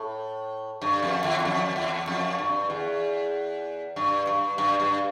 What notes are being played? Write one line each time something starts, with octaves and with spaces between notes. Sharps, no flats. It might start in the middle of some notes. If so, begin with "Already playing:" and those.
Already playing: A2
G2
F2
E2
E2
F2
E2
F2
G2
E2
G2
G2
G2
G2